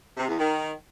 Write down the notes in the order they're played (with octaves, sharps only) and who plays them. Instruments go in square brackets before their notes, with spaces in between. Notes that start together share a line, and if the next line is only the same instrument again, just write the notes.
[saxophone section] C3
E2
D#3